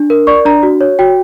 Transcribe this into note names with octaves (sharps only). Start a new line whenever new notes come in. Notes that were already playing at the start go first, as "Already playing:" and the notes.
Already playing: D4
A#4
D5 C#6
D4 A#5
F#4
C#5
F#4 G5